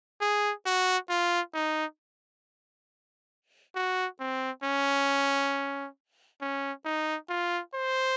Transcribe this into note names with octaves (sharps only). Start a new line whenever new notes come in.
G#4
F#4
F4
D#4
F#4
C4
C#4
C#4
D#4
F4
C5